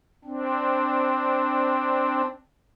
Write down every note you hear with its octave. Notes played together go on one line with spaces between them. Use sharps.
C4 D4